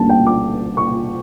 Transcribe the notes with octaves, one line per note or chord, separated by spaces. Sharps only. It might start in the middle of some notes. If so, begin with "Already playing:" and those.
Already playing: D2 D3 G3 A#3 C#4 A5
G5
D6
C#6